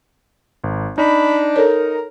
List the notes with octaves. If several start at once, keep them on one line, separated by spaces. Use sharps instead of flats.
G#1
D4 D#4 B5
A4 A#4 C#5